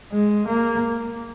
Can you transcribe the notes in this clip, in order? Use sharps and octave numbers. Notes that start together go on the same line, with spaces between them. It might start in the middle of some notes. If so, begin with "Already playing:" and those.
G#3
A#3